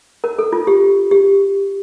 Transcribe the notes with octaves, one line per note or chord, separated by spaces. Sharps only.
A#4
A4
F4
G4
G4